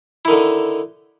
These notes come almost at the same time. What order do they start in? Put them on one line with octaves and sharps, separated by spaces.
E4 D#3 D3